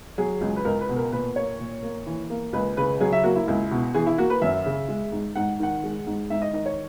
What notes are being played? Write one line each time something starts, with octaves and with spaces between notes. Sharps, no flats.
F#3 G#4
C#2
B4
C#2 A#4
B4
B2
A#4
A#2 B4
A#3 C#5
A#2
A#3
E3
A#3
C#2 B4
C#3 B4
F#3 G#4
E5
A#3 F#4
E4
C#2 E4
B2
E3 G#4
E4
A#3 F#4
B4
F#2 E5
C#3
G#3
G#2
G#2 F#5
D#3 F#5
G#3
G#2
G#2 E5
D#5
D#3 D#5
C#5